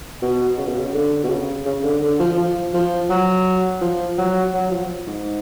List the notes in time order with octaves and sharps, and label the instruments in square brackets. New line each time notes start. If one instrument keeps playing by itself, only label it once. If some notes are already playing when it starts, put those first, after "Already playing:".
[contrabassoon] B2
C#3
B2
C#3
D3
B2
C#3
C#3
D3
D3
F3
F3
F3
F#3
F3
F#3
F#3
F3
G#2